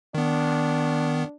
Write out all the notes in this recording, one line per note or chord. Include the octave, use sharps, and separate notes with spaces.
D#3 B3 D4